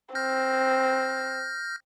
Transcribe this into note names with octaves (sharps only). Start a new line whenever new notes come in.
C4 F6 G6 A#6